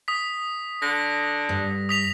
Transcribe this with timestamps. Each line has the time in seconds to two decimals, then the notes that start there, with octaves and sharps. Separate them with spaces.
0.08 D#6 B6
0.82 D3 A#6
1.49 G2
1.89 D#6 B6 F7